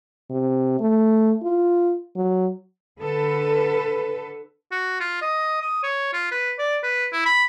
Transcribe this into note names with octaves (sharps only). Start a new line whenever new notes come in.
C3
A3
F4
F#3
D3 A4 B4
F#4
F4
D#5
D#6
C#5
F4
B4
D5
B4
E4
B5